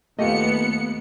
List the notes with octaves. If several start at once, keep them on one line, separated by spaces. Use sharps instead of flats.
D#2 A3 B3 F4 G4 D#5 C#7